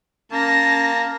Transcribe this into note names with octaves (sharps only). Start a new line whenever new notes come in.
A#3 C#4 A5 A#6